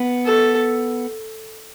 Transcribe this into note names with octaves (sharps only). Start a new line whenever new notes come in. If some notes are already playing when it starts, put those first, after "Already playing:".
Already playing: B3
A4